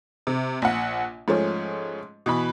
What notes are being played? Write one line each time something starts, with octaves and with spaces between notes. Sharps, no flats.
C3
A#1 F#5
G#2 F3 A3 C#4
B2 E3 B5